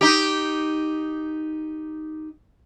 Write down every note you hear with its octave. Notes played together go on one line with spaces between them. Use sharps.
D#4 G4